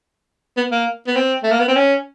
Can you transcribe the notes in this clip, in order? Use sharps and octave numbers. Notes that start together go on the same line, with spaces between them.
B3
A#3
B3
C4
A3
A#3
B3
C4
C#4